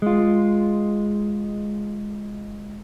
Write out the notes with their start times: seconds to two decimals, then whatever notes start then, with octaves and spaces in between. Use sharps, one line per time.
0.02 G#3 F4